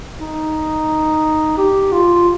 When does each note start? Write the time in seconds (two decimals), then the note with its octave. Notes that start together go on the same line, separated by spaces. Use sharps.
0.21 D#4
1.57 G4
1.92 F4